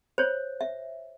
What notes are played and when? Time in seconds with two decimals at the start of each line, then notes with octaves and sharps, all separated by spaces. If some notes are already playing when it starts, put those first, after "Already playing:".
0.18 C5 C#5
0.61 E5